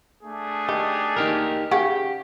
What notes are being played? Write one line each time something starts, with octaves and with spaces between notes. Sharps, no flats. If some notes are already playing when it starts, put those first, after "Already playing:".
A3 D4 G#4
D#3 G4
D#4 G4 A#4
C#3 F#4 G4 F#5